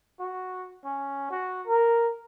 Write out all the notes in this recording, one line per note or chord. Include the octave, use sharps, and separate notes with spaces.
F#4
C#4
F#4
A#4